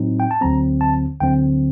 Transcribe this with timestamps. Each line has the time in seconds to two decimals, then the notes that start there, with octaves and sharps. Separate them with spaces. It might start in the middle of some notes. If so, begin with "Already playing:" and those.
Already playing: A2 F#3 C4 D#4
0.20 G5
0.31 A5
0.41 D2 D3 F#3 C4 A#5
0.81 A5
1.20 D2 D3 F#3 C4 G5